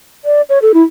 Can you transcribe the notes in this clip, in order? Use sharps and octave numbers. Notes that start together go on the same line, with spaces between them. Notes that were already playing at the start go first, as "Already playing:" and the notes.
D5
C#5
A4
E4